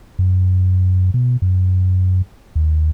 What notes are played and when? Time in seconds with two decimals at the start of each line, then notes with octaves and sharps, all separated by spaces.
0.19 F#2
1.14 B2
1.42 F#2
2.56 D#2